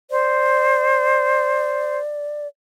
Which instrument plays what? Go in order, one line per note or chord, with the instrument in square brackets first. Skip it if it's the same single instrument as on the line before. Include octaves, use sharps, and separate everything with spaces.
[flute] C5 [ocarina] D5